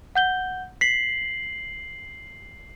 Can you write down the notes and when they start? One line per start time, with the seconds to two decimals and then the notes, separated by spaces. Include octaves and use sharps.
0.15 F#5 G6 G7
0.81 B6 C7 F#7